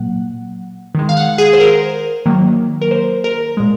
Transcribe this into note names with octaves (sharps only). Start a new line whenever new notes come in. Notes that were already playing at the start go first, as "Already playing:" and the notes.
Already playing: A#2 F#3 A#3 F#5
D#3 G#3
F5
F#5
G#4
C5
A#4
D#3 F#3 A#3
A#4
C5
A#4
A#2 G#3